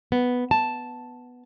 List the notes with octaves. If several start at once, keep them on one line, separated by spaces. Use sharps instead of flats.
B3
A5